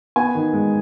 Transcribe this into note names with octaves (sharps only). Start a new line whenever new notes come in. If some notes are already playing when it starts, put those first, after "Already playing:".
B3 G#5
D#3
G#3